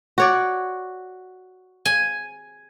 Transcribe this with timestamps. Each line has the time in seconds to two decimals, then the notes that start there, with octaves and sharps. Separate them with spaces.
0.18 F#4 C#5 D5
1.85 G#5